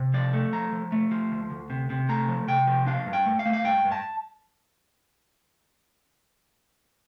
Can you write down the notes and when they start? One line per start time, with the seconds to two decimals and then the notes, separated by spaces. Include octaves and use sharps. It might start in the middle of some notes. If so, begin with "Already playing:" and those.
Already playing: C3
0.14 F3 D5
0.33 A3
0.53 F3 A#5
0.72 F3
0.92 A3
1.11 F3
1.31 D2
1.50 D2
1.70 C3
1.90 C3
2.09 A3 A#5
2.28 F3
2.48 C3 G5
2.67 F3
2.87 D4 F5
3.06 G2
3.13 G5
3.26 A3
3.39 F5
3.45 A3
3.53 F5
3.65 G2 G5
3.85 G2
3.92 A5